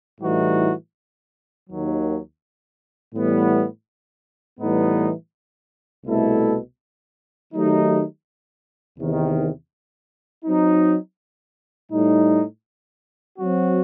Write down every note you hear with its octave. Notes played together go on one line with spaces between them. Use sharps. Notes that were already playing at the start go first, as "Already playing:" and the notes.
A2 E3 G3 D#4 F#4
D#2 D#3 F#3
A2 E3 G3 B3
A2 E3 G3 B3 D#4
C2 B2 A3 E4 A4
D#3 F#3 A3 D#4 G4
E2 C3 D#3
F#3 C4 D#4
A2 G3 D#4
F#3 C4 F#4